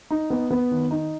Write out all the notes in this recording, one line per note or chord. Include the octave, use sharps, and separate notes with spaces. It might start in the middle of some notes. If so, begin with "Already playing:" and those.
D#4
B3
B3
D#3
D#4